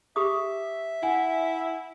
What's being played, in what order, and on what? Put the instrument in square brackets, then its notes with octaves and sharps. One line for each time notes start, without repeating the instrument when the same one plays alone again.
[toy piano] G4 D6 D#6 [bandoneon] E5
[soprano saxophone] E4 [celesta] F#5 G#5